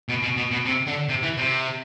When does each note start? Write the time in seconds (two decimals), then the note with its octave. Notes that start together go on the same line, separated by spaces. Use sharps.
0.09 B2
0.22 B2
0.37 B2
0.51 B2
0.65 C3
0.87 D3
1.09 C3
1.23 E3
1.37 C3